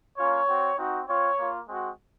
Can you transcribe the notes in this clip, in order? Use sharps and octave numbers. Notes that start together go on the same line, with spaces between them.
A#3 C#4 F4 C#5
C4 F#4
C4 D#4 F#4
C4 F4 C#5
A#3 F4
G#3 C4 F#4